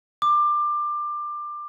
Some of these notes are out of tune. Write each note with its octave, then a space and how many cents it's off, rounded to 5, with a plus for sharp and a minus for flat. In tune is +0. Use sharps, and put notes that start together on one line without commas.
D6 +20